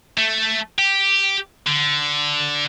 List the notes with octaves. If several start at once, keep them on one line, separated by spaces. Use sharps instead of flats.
A3
G4
D3